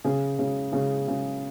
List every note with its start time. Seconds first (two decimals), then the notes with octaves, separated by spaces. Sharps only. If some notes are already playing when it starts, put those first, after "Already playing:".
0.04 C#3 G#4
0.39 C#3
0.72 C#3 G#4
1.08 C#3